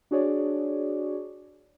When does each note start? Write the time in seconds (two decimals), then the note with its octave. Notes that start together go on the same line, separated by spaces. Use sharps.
0.11 D4 F#4 G#4 C#5 D5